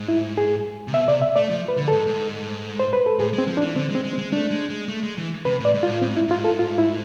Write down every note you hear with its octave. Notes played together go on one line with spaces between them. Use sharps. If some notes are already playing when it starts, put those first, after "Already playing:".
Already playing: G#2
E4
G#4
C3
B2 E5
C3 D5
E5
A3 D5
F3
B4
D3
G#2 A4
G#2
C5
B4
A4
A2 G#4
G#3 C4
F3
D4
E3
D3 C4
G#3
C4
G#3
C4
G#3
A3 D4
G#3
G#3
A3
G#3
E3
C3 B4
A2
D5
G#2
F4
A2
A2 C4
G#2
E4
G#2 F4
A4
F4
E4